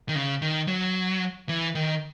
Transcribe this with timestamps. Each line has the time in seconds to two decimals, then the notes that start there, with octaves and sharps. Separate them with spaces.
0.09 D#3
0.15 C#3
0.42 D#3
0.68 F#3
1.49 E3
1.75 D#3